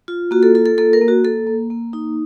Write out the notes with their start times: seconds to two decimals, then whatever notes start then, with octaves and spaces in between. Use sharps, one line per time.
0.08 F4
0.31 A#3 F#4
0.43 A4
0.55 F4 A4
0.66 A4
0.78 A#3 A4
0.93 A#4
1.01 A#3
1.08 F#4
1.24 A#3 A4
1.47 A#3
1.70 A#3
1.93 D#4